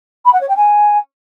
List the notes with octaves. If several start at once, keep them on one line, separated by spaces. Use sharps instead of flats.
B5
F#5
C#5
G5
G#5